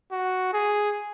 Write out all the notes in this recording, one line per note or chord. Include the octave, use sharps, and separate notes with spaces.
F#4
G#4